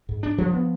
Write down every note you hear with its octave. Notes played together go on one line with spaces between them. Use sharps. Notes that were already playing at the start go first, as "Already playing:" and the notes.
G#2
D4
F3
B3